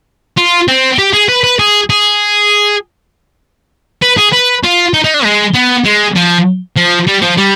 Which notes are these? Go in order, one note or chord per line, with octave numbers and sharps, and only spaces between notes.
F4
C4
G4
G#4
B4
B4
G#4
G#4
B4
G#4
B4
F4
D#4
D#4
D4
G#3
B3
G#3
F3
F3
G3
F3
G3